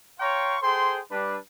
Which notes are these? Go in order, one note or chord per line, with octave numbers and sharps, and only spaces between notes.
C#5 F5 G5 A#5 C6 C#6
G#4 A4 C5 G5 C6
G3 D4 B4